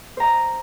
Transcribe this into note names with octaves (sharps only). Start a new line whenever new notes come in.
C5 D#5 A#5